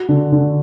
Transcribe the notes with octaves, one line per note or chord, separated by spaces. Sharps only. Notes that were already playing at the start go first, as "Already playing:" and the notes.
Already playing: F#4
D3
D3